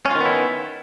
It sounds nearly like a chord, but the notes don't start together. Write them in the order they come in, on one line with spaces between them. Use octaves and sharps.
C#4 F4 D#3 B3 E4